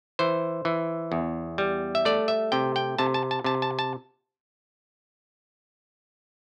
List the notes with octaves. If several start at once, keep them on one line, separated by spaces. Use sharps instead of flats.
E3 C5
E3
E2
G3
E5
A3 D5
E5
C3 G5
G5
C3 A5
A5
A5
C3 A5
A5
A5